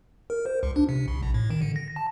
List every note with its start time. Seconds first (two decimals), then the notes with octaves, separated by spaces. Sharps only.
0.30 A#4
0.46 C5
0.63 C#2
0.76 D4
0.89 C3
1.08 C2
1.23 A#1
1.34 A2
1.50 D#3
1.61 D3
1.76 A#6
1.96 A5